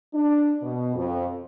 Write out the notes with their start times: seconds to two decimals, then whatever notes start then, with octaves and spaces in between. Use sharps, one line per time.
0.14 D4
0.63 B2
0.95 F2